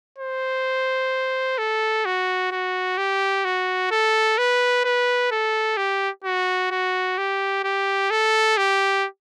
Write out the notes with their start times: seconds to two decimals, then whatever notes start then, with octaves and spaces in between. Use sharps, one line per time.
0.18 C5
1.58 A4
2.05 F#4
2.51 F#4
2.98 G4
3.45 F#4
3.91 A4
4.38 B4
4.85 B4
5.31 A4
5.77 G4
6.24 F#4
6.71 F#4
7.18 G4
7.64 G4
8.10 A4
8.57 G4